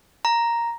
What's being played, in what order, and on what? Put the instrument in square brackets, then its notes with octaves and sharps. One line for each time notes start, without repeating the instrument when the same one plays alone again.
[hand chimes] A#5